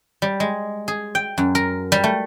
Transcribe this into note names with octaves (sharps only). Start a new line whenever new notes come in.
G3
G#3
G#4
G5
F#2
A#4
G3
A3